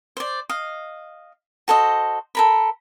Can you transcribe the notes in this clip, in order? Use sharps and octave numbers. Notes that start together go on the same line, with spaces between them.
C5 D5
D#5 F5
F#4 A4 C5 D#5
A4 A#4 B5